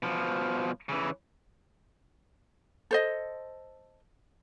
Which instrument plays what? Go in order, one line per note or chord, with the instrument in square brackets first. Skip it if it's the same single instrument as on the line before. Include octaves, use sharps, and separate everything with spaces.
[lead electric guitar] B2 F3
C#3 E3
[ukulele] A4 C5 D#5